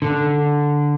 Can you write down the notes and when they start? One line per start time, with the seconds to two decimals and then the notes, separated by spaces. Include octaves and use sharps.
0.02 D3